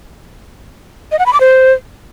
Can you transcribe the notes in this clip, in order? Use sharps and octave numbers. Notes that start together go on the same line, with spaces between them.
D#5
F#5
B5
D6
C5